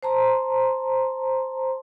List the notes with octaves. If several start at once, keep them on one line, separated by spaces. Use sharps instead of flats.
C5 A5 A#5 C6